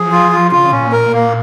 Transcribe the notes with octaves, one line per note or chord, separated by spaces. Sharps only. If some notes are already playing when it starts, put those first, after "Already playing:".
Already playing: F3 G#4
F4
F4
C#3 F4
C#3
A#2 C#4
A#2
A#4
A#3